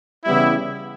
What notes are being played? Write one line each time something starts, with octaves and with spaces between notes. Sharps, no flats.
C#3 E3 G3 B3 E4